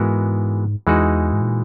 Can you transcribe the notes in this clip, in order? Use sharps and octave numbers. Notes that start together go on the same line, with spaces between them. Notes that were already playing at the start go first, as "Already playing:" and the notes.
Already playing: G#2 E3 G#3 B3 F#4 A#4
E2 E3 G#3 D#4 F#4
G#2
A#2